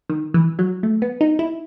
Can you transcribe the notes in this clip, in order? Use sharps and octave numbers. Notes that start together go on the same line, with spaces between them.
D#3
E3
F#3
A3
B3
D#4
E4